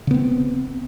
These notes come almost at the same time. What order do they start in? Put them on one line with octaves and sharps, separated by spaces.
C#3 B3 C4